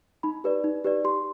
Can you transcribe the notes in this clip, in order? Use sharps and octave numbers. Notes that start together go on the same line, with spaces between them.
D#4 B5
G4 B4 D5
D#4
G4 B4 D5
G4 C6